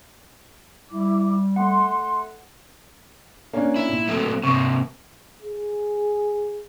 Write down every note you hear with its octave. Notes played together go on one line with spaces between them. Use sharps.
G3 E4 D6
A3 F#5 C6
A#3 C#4 D4
E4
A#2
F#3 A3 C4
C3 A#3 C#6
G#4